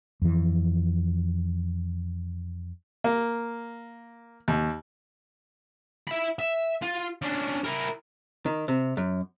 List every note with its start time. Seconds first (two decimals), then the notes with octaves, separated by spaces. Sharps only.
0.22 F2 E3
3.04 A#3
4.48 D#2
6.08 E5 B5
6.39 E5
6.82 F4
7.22 C#4 D4
7.64 E4 A#4
8.46 D#3
8.68 C3
8.97 F#2